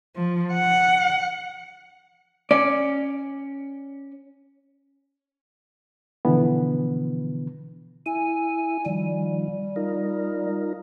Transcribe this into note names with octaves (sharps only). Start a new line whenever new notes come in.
F3
F#5
C#4 D5
B2 D3 E3 F3 B3
E4 G#5
D#3 F3 G3
D#4 F4 A#4